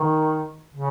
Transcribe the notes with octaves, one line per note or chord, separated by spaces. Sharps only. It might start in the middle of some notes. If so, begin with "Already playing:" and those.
Already playing: D#3
C#3